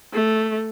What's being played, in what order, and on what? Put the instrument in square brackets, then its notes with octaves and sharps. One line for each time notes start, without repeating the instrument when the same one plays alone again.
[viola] A3